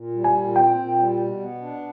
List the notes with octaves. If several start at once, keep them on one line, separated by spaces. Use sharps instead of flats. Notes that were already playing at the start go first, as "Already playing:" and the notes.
Already playing: A#2
G3
G#5
A#2
C4 G5
A#2
G3
B2
B3
D4